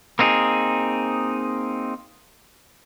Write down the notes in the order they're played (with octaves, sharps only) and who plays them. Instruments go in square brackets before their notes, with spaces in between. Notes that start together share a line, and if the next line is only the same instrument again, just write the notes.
[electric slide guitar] A#3 C4 D#4 F4 G#4